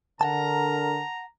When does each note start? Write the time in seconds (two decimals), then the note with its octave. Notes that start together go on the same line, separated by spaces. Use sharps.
0.21 D3 A#4 F#5 G5 A5 A#5